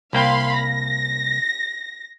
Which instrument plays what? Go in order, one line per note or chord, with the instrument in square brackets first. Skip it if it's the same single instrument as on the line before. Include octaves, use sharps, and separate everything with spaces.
[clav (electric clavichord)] C2 A#3 G5 [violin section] F5 B5 C6
[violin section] A#6